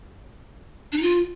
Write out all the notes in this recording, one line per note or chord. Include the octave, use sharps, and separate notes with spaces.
D4
D#4
F4